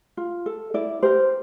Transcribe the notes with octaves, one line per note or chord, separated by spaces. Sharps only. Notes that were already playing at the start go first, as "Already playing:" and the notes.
F4
A4
E4 D5
G4 A#4 C5